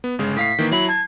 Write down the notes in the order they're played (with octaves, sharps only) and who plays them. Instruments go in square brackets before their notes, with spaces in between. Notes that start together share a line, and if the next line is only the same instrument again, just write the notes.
[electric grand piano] B3
G1 C#3 G#3
[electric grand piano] A2 F5 C7 [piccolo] B6
[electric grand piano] D#3 E3 A#3
[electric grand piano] F#3 E4 B5 [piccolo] F#7
[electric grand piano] A5 [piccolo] G#6